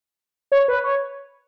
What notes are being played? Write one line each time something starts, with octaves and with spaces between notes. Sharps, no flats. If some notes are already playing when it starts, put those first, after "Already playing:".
C#5
B4
C#5